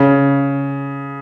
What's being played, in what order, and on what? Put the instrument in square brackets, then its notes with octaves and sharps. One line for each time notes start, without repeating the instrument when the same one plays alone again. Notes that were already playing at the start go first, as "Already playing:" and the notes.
Already playing: [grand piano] C#3